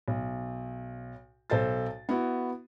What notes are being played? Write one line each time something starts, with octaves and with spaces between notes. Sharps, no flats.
B1
B1 A4 C5 A6
B3 E4 F#4